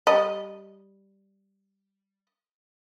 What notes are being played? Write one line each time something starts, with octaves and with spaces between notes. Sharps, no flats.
G3 D#5